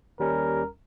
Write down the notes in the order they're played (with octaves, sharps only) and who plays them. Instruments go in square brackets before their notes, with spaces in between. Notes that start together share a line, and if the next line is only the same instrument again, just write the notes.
[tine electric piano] D#2 G3 C#4 [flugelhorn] A#4